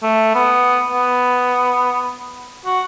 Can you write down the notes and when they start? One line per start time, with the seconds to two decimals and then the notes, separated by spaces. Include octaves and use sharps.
0.03 A3
0.35 B3
0.90 B3
2.66 F#4